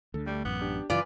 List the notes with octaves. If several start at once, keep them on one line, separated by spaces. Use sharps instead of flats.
D2 D3 A4
G3 A3 D4
A1 F#2 B3 D6
D4 G4
F#2 C#3 E3 F4 B4 D5 G#5